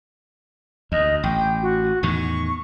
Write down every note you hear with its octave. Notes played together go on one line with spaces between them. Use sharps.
D2 D#5
A1 G5
F#4
E2 A2 D#3 C#6